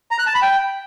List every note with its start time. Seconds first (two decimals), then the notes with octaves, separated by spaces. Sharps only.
0.11 A#5
0.19 F#6
0.27 A5
0.34 B5
0.42 G5